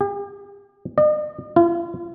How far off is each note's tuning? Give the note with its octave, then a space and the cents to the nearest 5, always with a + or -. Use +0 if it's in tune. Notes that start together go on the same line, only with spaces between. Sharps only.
G4 +40
D#5 -45
F4 -45